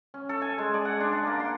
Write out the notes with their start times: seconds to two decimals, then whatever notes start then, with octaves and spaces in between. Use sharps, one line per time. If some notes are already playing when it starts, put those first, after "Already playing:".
0.14 C#4
0.29 A4
0.42 G#5
0.58 G#3
0.74 D5
0.85 F#5
1.00 D4
1.13 A5
1.27 A#3
1.40 C6